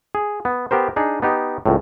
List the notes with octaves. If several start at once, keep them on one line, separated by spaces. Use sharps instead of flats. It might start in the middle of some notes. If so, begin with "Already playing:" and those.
G#4
B3
B3 G4 A#4 C5
D4 D#4 G#4
B3 D#4 G4
C#2 A2